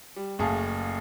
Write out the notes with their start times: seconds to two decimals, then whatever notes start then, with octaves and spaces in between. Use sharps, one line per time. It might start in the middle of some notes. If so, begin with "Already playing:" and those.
0.16 G3
0.39 F#1 A3 G#4 F5 A5